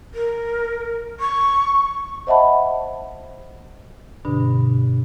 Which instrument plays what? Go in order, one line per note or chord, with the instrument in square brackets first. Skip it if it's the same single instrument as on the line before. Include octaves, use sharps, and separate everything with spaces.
[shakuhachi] A#4
C#6
[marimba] C5 D#5 E5 F#5 A5 B5
G2 B2 D3 D4